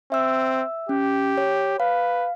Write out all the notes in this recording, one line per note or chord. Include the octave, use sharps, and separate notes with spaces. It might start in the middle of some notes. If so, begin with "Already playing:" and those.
C4 E5 E6
C#4 G4
C#5
B4 F5